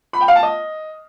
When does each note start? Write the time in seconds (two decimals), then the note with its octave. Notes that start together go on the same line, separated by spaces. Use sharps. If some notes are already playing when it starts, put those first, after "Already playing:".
0.13 B5
0.21 G5
0.28 F5
0.36 A5
0.43 D#5